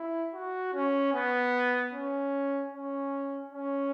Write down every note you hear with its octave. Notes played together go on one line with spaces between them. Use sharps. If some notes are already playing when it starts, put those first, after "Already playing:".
Already playing: E4
F#4
C#4
B3
C#4
C#4
C#4